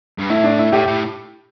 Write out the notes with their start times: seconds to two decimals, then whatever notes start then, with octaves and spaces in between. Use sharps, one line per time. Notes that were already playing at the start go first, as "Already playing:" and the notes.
0.19 G2
0.30 A2 E4
0.44 D4
0.59 E4
0.72 A2 G4
0.87 A2